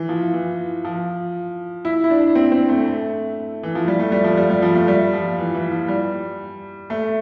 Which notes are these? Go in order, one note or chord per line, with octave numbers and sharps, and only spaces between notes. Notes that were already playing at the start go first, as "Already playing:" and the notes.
Already playing: E3
F3
E3
F3
E4
E4
D4
C4
C4
A3
A3
E3
F3
G3
A3
G3
F3
G3
G3
F3
A3
G3
F3
E3
E3
F3
G3
A3